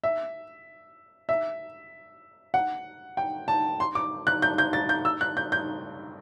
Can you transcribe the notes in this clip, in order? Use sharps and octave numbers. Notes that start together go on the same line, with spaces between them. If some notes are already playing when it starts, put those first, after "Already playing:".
E5
E5
F#5
G5
A5
C6
D6
F#6
G6
G6
A6
G6
E6
F#6
G6
G6